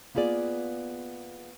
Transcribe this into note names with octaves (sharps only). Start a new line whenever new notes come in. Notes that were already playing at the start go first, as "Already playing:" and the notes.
A#3 B3 F4 G#4 D5